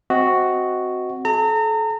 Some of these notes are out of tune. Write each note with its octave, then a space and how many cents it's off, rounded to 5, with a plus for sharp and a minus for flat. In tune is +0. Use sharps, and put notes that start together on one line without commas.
C4 +0 F#4 +0 D#5 +25
A4 -35 A#5 -35